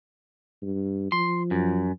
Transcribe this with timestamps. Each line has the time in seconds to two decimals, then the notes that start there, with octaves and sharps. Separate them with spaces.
0.62 G2
1.12 F3 C6
1.51 F#2